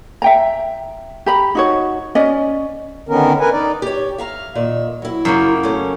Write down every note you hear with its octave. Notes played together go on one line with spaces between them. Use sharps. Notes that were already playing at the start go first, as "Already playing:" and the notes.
E5 G5 A#5
G4 A#5 B5
D#4 F#4 C#5
C#4 D5 D#5
D3 D#3 B3 C#4 A#4
A#4 B4 G#5
D#4 D5
G4 C#5
E5 F5 A#5
A#2 D#3 E5
F#3 E4
F#2 C#3 A#3
A3 C#4